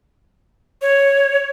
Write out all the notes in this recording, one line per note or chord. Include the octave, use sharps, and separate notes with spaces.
C#5